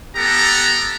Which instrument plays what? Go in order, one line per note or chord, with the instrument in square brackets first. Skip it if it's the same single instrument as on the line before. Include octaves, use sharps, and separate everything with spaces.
[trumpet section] B3 G4 A4 A#5